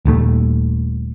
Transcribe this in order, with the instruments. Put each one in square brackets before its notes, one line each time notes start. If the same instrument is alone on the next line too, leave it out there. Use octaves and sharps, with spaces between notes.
[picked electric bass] D#1 D#2 A3